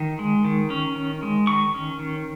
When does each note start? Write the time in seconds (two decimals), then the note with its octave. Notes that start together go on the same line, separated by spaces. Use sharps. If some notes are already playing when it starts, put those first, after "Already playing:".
Already playing: D#3
0.19 G#3
0.45 D#3
0.70 C#4
0.95 D#3
1.22 G#3
1.47 D#3 C#6
1.74 C#4
1.99 D#3